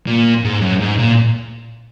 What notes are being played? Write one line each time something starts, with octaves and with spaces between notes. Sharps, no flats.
A#2
G#2
F#2
G#2
A#2